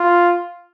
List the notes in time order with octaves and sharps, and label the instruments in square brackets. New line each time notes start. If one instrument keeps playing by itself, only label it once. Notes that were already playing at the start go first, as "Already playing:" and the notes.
Already playing: [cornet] F4